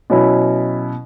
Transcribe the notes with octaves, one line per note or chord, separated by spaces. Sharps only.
B2 F#3 C#4 E4